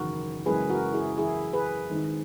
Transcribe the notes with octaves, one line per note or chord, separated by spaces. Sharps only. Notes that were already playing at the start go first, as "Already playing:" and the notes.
Already playing: F#1 E2 D#3 F#4 A#4
F#1 F#2 E3 G#3 G#4 B4
F#4 A#4
E4 G#4
F#1 E2 C#3 E4 G#4
G#4 B4
G#1 G#2 D#3